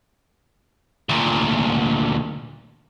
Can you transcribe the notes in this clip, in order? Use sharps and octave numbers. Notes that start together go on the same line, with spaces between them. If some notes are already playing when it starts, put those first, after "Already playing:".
D2 A#2